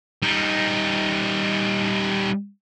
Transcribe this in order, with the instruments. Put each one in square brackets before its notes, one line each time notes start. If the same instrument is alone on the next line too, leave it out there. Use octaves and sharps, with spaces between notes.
[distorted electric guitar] G3 D#4